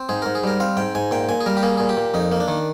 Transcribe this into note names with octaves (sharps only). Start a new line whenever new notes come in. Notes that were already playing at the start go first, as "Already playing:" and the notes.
Already playing: C4
G#2 G#4
G#2 A#4
G#4
G3 A#4
C4 F5
G#2 G5
G#2 G#5
A#2 G5
A#2 G#5
G#4
G3 A#4
G4
A#3 G#4
A#2 G#4
G4
A#2
F2 D#4
A#3
D4
D#3